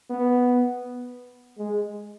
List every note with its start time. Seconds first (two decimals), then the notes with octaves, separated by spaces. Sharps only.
0.10 B3
1.58 G#3